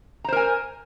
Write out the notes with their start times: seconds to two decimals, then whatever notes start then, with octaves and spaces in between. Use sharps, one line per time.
0.24 A#5
0.28 C5
0.32 A#4
0.36 G#5